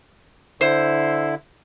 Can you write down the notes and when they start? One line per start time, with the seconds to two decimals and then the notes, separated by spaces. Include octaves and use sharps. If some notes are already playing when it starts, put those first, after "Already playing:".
0.61 D3 E4 C5